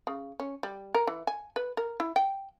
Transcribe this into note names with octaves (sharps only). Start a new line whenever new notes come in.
C#3
C#4
G3
A#4
E3
G#5
B4
A#4
E4
G5